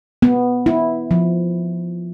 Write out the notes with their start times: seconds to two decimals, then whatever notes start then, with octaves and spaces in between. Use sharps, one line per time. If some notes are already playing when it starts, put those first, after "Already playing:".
0.22 B3
0.66 E4
1.11 F3